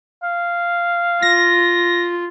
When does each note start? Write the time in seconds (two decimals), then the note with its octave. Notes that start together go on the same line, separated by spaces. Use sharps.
0.23 F5
1.22 F4 A#6